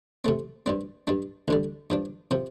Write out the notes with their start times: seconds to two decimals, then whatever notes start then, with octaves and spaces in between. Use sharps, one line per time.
0.25 C3 A3 C4
0.66 G2 G3 C4
1.07 G2 G3 D4
1.48 D2 D3 G3
1.90 G2 F3 D4
2.31 C3 F3 C4